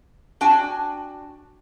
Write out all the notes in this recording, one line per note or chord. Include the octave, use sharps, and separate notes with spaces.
D4 F#4 G5 G#5